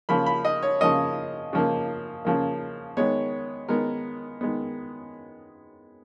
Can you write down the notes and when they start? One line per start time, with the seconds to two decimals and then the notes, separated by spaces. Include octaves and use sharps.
0.09 C#3 F3 A#3 B5
0.26 B5
0.45 D#5
0.62 C#5
0.81 C#3 F3 A#3 D#5
1.53 C#3 F3 A#3
2.25 C#3 F3 A#3
2.97 D#3 G#3 B3 C#5
3.68 D#3 G#3 B3 A#4
4.41 D#3 G#3 B3